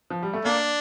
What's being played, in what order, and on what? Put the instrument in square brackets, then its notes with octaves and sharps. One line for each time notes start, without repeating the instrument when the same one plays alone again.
[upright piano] F3
G3
A3
[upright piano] A#3 [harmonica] D4